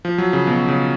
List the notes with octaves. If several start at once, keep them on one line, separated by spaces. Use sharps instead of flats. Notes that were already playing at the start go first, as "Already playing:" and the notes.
F3
F#3
C#3
B2
C#3